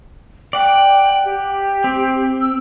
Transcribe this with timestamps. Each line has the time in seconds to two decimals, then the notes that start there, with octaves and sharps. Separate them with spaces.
0.53 D5 F#5 G5
1.25 G4
1.84 C4
2.41 E6